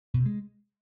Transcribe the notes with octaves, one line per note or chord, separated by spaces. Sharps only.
B2
C3
G#3